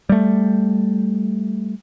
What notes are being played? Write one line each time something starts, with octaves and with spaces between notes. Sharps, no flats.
G3 A3